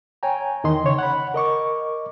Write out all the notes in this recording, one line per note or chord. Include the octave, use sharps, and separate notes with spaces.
C#5 G5 G#5 A#5
E2 D#3 D#5 C6
C#3 C#5
F#5 B5
A#4 D#5 C#6 D6